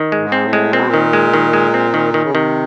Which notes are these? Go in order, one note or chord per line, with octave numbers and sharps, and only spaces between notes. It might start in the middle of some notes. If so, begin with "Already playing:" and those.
Already playing: D#3
G#3
G#2
C4
A2
G#3
A#2 C4
B2
A#2 D#3
G#3
D#3
G#3
C4
D#3
D#3
C#3
C3 D#3